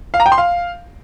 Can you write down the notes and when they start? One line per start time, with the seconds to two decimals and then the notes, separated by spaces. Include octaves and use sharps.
0.14 F5
0.20 A#5
0.26 G5
0.32 C6
0.38 F5